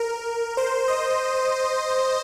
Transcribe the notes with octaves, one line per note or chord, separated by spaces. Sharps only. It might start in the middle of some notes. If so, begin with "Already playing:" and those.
Already playing: A#4
C5
D#5